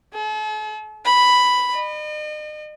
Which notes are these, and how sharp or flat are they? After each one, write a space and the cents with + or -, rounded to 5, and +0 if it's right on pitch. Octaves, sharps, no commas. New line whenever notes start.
A4 -45
B5 +5
D#5 -40